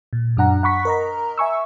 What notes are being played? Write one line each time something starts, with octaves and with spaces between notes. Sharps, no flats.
A#2
F#2 F#3 D4 F#5 A#5
F#5 B5 C#6 B6
A#4 D#5 A#5
E5 G#5 C#6 E6